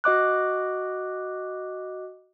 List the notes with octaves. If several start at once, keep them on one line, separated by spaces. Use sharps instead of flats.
F#4 D#5 D6 F#6